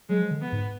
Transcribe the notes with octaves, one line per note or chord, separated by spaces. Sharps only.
F#3 G#3
F3
D3
B3
G#2